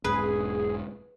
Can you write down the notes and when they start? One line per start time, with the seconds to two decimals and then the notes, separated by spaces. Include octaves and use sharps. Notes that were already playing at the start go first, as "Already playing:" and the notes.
0.04 E1 G#2 G#4 B4